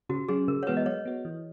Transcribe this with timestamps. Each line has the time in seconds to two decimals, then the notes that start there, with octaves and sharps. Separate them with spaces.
0.09 C#3 F#4
0.28 F#3 C#4 G#4
0.48 C#3 A#4
0.63 C#5
0.67 E3 G#3 B3 F#4 B4
0.77 D#5
0.86 F#3 C#5
1.05 B3 F#4
1.25 E3